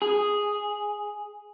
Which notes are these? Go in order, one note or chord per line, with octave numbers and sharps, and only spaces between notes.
G#4